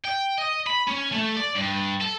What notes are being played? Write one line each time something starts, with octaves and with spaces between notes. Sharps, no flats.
G5
D#5
B5
C#4
A3
D5
G2
A4